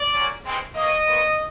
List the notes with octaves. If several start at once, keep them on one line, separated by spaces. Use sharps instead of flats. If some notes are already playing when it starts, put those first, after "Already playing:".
Already playing: D5
A#2 F#3 A#3 C#4
A2 E3 G#3 C4
B2 F#3 A#3 D#5
A#2 F#3 B3